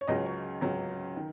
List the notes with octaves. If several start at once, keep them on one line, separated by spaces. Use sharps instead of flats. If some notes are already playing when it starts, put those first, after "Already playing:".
C#5
C#2 C#3 F#3 D#5
C#5
C#2 C#3 F#3
D#3